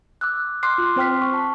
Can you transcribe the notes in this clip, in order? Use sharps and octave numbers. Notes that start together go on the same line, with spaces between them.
D6 E6 F#6
C6 D6 F6 F#6 C7
F4
C4 C5 G5 F6 B6
C#6
A5